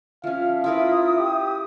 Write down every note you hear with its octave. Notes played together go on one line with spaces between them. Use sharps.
F3 C#4 E5 F5
E4 F4 A#4 B4 D#6
G4